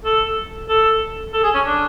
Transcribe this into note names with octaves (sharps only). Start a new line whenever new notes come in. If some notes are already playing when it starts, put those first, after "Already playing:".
A4
A4
A4
G#4
C#4
D4